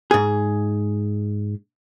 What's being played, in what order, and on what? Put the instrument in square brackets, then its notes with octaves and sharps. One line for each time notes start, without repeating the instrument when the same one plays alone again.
[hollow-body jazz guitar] G#2 G#4